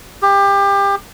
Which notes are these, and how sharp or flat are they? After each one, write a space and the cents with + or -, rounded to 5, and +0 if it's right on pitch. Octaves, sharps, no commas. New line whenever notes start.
G4 +25